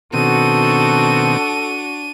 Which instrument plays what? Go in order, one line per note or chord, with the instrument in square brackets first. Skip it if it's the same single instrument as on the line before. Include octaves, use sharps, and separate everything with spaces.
[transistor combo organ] B2 D#3 C4 [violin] D4 D#7 [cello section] F#4 [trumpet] A4